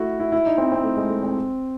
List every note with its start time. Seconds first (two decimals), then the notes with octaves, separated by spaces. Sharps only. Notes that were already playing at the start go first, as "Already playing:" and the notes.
Already playing: A3 E4 F#4
0.20 E4
0.32 E4
0.46 D#4
0.58 C4
0.72 C4
0.84 A3
0.97 G#3
1.09 A3
1.23 C4